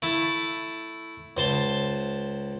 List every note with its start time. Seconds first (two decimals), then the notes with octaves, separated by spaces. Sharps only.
0.02 A3 E4 A5
1.37 C#2 C5 A5 C6